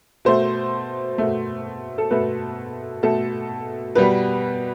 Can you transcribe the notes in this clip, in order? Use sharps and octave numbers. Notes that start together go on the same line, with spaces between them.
B2 A3 C5
B2 A3
A4
B2 A3 B4
B2 A3 A4
B2 G3 B3 B4